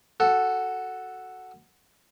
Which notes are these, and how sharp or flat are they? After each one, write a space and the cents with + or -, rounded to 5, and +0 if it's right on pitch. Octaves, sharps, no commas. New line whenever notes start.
F#4 +0 A4 +0